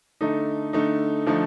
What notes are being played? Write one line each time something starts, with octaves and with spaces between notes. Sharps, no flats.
D3 A3 D#4
D3 A3 D#4
D3 F3 A3 D#4